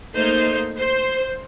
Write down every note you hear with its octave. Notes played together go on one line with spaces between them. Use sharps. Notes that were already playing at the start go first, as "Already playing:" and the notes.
A3 A#3 D#4 C5
C5